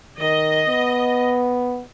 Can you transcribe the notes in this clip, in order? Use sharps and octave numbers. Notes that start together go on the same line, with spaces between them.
D#3 D#5
B3